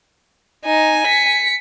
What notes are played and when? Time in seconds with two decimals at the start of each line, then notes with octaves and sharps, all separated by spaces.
0.65 D#4 G#5
1.07 B6 C#7